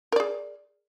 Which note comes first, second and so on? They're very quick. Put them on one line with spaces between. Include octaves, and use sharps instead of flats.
A#4 D5 G#4